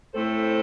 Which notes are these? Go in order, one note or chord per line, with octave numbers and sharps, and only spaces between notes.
A2 A3 C4 A4 C5